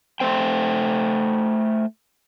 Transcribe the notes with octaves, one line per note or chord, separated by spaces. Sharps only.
A3 C5 G5